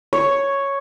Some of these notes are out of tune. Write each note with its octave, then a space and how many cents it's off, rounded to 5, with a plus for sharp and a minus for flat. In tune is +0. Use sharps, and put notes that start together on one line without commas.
C#5 +0